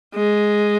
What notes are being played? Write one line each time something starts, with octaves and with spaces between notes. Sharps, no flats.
G#3